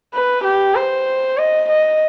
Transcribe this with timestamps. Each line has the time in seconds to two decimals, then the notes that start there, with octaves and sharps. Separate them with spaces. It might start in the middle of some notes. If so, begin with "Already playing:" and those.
0.14 B4
0.44 G4
0.75 C5
1.38 D#5
1.69 D#5